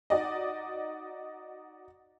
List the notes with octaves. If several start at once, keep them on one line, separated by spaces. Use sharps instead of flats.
D#4 F#4 D5 D#5